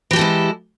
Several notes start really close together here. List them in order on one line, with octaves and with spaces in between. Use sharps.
E3 G4 A4 E4 G#3